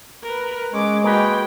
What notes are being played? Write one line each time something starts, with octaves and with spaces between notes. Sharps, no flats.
A#4 B4
G#3 C#4 D6
A#3 F#4 G#4 B4 G5